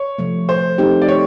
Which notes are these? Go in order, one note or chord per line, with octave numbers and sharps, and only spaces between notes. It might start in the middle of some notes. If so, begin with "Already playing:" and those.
Already playing: C#5
C3 F3 A3
C5
A3 C4 D#4 G4
D5
C#5